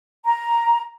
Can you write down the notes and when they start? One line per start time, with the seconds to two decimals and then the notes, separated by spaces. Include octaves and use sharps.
0.25 A#5